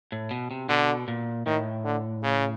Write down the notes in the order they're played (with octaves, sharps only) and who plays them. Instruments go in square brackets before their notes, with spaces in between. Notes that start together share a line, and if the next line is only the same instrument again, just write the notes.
[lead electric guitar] A2
B2
C3
[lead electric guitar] B2 [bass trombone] D3
[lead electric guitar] A#2
[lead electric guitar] A2 [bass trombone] D#3
[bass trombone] D3
C#3